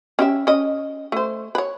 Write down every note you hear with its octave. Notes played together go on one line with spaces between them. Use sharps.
C#4 G4 E5
C#4 D#5
A3 C5
B4 C#5